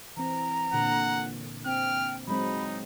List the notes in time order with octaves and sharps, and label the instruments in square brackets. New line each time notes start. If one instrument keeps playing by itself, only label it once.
[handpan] E3 C4 [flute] A#5
[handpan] A#2 D3 [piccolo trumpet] F#5
[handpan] C4 [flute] G5 [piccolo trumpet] F6
[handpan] F#3 G#3 C4 [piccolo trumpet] D#4 [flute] B5